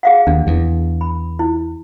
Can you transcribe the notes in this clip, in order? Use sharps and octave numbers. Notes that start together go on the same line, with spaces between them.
G#4 F5 F#5
D#2 D4
E2
B5
E4